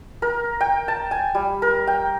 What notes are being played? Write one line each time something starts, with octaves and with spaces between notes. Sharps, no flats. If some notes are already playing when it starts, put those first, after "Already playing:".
A#4
G5
A5
G#5
G3
A#4
G5